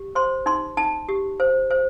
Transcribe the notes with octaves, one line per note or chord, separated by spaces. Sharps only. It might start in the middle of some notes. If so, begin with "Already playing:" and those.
Already playing: G4
C5 C6
D#4 C6
D#4 A5
G4
C5
C5